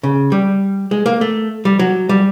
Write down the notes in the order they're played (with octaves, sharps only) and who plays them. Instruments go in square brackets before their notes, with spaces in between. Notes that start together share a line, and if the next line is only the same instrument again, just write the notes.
[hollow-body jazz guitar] C#3
G3
G#3
A#3
A3
G3
F#3
G3